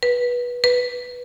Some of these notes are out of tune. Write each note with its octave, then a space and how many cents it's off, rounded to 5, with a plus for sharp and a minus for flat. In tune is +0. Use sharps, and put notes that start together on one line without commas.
B4 -20
B4 -5